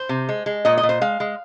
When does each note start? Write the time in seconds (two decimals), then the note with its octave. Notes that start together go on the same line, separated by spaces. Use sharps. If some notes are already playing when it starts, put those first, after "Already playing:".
Already playing: C5
0.09 C3
0.29 G#3
0.46 G#3
0.65 A#2 D#5
0.77 D#5
0.83 A#2
0.89 C5
1.01 G#3 F5
1.20 G#3